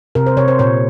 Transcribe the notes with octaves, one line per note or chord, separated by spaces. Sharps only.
C3 A#4
C5
C3 C#5
C5
A#2 C#5